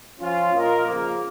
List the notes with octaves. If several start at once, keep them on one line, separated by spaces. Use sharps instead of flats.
F3 C#4 F4
A#2 A#3 F4 A#4 D#5
C#3 F3 A#3